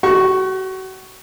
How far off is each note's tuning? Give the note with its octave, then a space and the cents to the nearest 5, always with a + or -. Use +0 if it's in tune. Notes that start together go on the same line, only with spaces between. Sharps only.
F#4 +35 C#6 +0